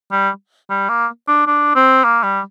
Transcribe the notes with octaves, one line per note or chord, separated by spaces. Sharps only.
G3
G3
A#3
D4
D4
C4
A#3
G3